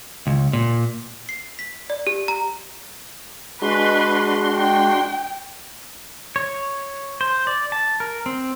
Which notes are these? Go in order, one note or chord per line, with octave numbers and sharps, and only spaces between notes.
C#2
A#2
C7
B6
D5
G4
A#5
G#3 D4 F#4 B4 C6
G5
C#5
C5
D5
A5
A#4
C4